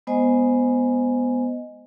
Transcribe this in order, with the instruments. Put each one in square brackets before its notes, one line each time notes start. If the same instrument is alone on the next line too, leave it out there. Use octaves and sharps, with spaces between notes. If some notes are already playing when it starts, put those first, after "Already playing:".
[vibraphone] G#3 B3 C5 D#5 G#5